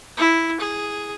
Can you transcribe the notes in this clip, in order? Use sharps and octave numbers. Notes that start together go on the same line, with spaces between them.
E4
G#4